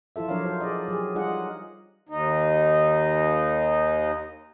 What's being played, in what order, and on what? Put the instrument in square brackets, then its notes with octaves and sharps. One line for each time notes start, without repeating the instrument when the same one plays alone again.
[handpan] F3 E4 F4 A4 E5
F#3 D4 A#4 C#5 D5 F5
D#4 F4 A4 A#4 C5
G#4 D5 D#5
F#3 G4 G#4
G3 D#4 F4 G#4 D#5 F#5
[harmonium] D#2 D#4